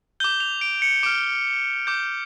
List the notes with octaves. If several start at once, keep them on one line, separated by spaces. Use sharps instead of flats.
D6 G6 G7
F7
D7
C#7
D6 F6 D7
D6 G6